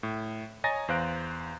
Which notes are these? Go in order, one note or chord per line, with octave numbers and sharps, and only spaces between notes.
A2
C#5 D#5 G#5 A#5 A6 A#6
E2 C5 F5 F#6 D7